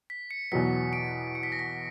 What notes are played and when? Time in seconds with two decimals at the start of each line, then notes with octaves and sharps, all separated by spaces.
0.10 B6
0.31 C#7
0.52 E2 B2 F#3 B3 B6
0.93 D7
1.35 C#7
1.43 B6
1.52 A#6
1.59 B6